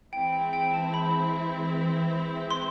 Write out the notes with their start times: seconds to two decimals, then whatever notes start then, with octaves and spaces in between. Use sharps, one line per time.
0.13 E3 G#3 C4 E4 G5
0.33 G5
0.53 G5
0.74 A5
0.94 B5
2.50 C6